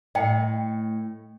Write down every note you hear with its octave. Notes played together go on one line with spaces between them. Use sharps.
A2 D#5 G5